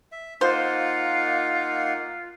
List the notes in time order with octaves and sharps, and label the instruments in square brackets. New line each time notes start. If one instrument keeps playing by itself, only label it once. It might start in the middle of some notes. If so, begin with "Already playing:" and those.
[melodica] E5
[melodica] A#3 D#4 F#5 [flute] F4 [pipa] C5